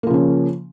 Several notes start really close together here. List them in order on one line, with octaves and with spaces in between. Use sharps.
A#3 F3 C#3 C#4